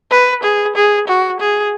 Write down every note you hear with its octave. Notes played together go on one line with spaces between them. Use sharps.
B4
G#4
G#4
F#4
G#4